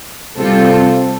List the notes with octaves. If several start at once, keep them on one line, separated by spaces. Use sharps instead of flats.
C3 G3 C4 F4 A4